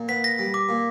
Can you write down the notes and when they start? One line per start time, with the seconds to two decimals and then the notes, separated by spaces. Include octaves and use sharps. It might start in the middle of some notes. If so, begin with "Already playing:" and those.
Already playing: A#2
0.08 B3 B6
0.24 A#6
0.39 G3
0.54 D6
0.69 A#2